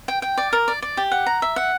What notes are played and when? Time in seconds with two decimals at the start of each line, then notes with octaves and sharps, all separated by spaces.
0.08 G5
0.22 G5
0.38 D5
0.53 A#4
0.68 D5
0.82 D5
0.97 G4
1.12 F#5
1.26 A#5
1.42 E5
1.56 F#5